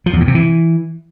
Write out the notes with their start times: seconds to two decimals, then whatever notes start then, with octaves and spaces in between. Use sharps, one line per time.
0.06 F3
0.13 E2
0.20 A2
0.28 C3
0.35 E3